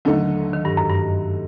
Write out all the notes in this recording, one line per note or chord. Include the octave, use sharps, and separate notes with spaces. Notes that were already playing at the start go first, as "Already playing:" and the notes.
D#2 D3 F#3 A3 D#4 A4
D#3
G2
F#2
G2